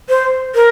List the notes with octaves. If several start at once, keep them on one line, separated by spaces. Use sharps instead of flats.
C5
A#4